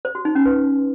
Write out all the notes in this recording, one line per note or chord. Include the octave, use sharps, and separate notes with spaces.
C5
F#4
D#4
C#4
B4